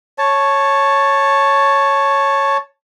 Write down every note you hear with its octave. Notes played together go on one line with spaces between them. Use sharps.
C#5 A5